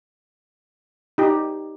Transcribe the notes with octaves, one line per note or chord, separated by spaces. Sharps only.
D#4 G4